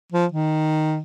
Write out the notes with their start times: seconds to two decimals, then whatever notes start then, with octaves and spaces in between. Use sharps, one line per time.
0.12 F3
0.32 D#3